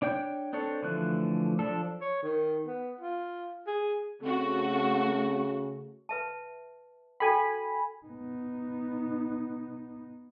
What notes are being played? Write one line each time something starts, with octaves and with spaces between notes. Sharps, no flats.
D4 C#5 G5 G6
C4 D4 A4 C#5
D3 E3 F3 A3 F#6
F3 D4 A4
C#5
D#3
B3
F4
G#4
C#3 A3 C4 F#4
B4 E5 A5
F#4 A4 G5 G#5 B5
B3 D#4